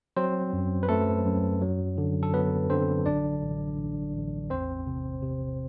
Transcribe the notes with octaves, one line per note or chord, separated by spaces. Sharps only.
F#3 C4 C5
F#2
B4
F#2 A3 A4
F#2
F#3
D3
A4
F#3 B3 B4
D3 C4 C5
A1 D4 D5
A1
A1
A1
E2 C4 C5
C3
C3